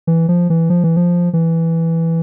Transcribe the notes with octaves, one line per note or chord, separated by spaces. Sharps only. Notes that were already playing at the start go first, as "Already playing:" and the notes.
E3
F3
E3
F3
E3
F3
E3